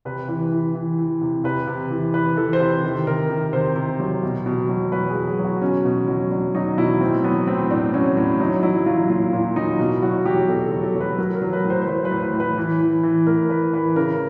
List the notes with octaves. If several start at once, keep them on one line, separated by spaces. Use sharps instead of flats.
C3 B4
E3 B4
E3
E3
E3
C3
C3 B4
C3
E3
E3 B4
E3 A4
C5
C3 B4
D#3
C3 A#4
D#3
C3 C5
C3
F#3
B2
B2
F#3
F#3 B4
G#4
F#3
G#4
F#3
F#4
B2 C#4
B2
F#3
F#3 D4
F#3 D#4
B2 E4
A2 C4
F#3 B3
A2 C4
A2 D4
F#3 C#4
A2
F#3 D#4
F#3 E4
F#3 F4
A#2 F4
A#2
F#3 D#4
B2 E4
F#3 F#4
F#3 G4
B2 A4
A4
F#3
A4
F#3
B4
F#3 A#4
A#4
F#3
B4
A2
C5
C5
F#3 B4
B4
A2
B4
A2
B4
E3
E3
E3
A2 A#4
A2 B4
E3 B4
C#3 A#4